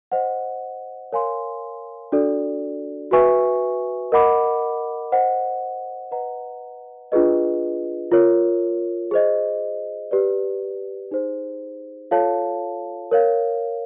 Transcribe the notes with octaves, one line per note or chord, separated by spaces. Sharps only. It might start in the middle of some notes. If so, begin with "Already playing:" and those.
C5 D#5 F#5
A#4 C#5 F5 G#5 C6
D4 F#4 A4 D5
F#4 B4 E5 G#5 C#6
A#4 D#5 F#5 B5 D6
C5 D#5 F#5
B4 D#5 F#5 A#5
D4 F4 G#4 B4 D#5
F4 A#4 C#5
G#4 C5 D#5
G4 B4 D5
D#4 G#4 C5
F4 A4 C#5 F5 A5
A#4 C#5 F5